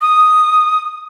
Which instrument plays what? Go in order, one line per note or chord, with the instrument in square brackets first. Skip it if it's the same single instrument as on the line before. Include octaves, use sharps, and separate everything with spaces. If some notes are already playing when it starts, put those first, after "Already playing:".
[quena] D#6